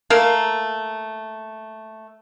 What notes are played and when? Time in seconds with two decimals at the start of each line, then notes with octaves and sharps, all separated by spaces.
0.10 A3 A#3 A#4 F5